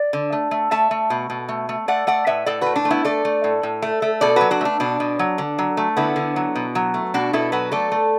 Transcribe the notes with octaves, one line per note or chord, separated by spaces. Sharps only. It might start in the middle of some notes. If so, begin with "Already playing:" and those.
Already playing: D5
D3
A3
A3
A3 E5 A5
A3
B2
B2
A3
A3
A3 D5 F#5
A3 D5 F#5
A2 B4 E5
A2 A4 D5
A3 F#4 B4
D4
A3
B3 E4
A3 A4 D5
A3
A2
A2
A3
A3
B2 A4 D5
F#3 F#4 B4
D4 F#4
A3 D4
B2 D4
B2
F#3
D3
F#3
A3
D3 B3 E4
D3
F#3
B2
F#3
A3
B2 D4 F#4
B2 E4 A4
F#3 F#4 B4
A3 A4 D5
A3